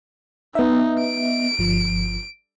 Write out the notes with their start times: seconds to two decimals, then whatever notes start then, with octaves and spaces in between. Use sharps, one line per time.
0.55 B3 D#4 D#5 E5
1.01 D7
1.58 G1 F3